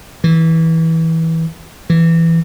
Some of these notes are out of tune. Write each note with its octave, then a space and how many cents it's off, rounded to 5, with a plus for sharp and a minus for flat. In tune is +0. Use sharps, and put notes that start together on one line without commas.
E3 -20
E3 +5